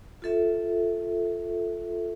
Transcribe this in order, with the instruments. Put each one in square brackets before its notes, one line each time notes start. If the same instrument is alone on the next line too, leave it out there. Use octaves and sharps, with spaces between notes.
[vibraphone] F4 A4 E5